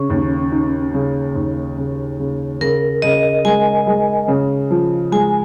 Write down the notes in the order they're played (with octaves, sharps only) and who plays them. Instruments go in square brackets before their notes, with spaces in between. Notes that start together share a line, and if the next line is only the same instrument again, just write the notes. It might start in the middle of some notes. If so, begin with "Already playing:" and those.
Already playing: [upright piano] C#3 [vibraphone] C#4
[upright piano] D#2
D#4
C#3
D#2
C#3
C#3
[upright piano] C#3 [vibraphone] A#4
[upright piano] C#3 [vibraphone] D#5
[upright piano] G#3 [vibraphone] G#5
[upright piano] G#3
C#3
F3
[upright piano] G#3 [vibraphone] G#5